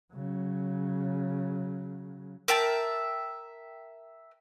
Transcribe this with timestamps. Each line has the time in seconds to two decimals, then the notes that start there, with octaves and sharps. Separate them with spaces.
0.13 C#3 F#3
2.48 A#4 E5 G5 A5